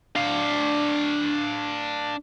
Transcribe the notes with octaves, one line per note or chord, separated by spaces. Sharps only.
D4 F5